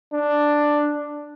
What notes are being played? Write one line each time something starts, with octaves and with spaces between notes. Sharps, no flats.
D4